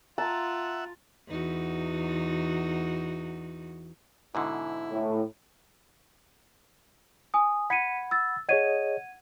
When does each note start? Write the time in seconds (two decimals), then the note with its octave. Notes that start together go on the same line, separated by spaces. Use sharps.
0.18 F4 E5 F#5 A5 A#5
1.28 E2 D#4 F#4
4.35 G#2 B2 D3 E4
4.91 A2
7.34 G#5 D#6
7.70 F#5 B5 G#6 B6 C#7 D#7
8.11 E6 A6
8.49 G#4 C#5 D#5 F#5 G#6 D#7